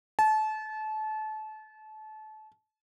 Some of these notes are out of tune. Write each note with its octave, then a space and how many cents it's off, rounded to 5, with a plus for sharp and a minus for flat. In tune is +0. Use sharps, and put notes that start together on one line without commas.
A5 -30